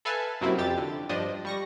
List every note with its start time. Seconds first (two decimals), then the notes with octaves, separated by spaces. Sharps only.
0.05 A4 B4 E5 F5 G#5 A5
0.41 F#2 C3 F#3 A#3 C4 E4
0.58 F2 G4 A6
0.77 D3
1.09 G2 F3 D4 D#5
1.45 G3 C#6 A#6